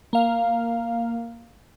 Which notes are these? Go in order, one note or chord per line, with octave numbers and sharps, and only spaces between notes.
A#3 F5